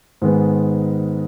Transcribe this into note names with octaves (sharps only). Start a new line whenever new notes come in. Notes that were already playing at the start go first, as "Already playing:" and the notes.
G#2 D#3 G#3 B3